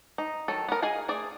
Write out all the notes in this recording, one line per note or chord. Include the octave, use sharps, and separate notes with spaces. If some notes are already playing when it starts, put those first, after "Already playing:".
D#4
D#3 F#3 A4
B3 A#4
G#4 D#5 F5 G#5
A3 G#4 D5